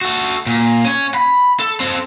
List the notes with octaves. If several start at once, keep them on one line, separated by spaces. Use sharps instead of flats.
F#4 A4
A#2
C#4 C#5
B5
A4
C4 A4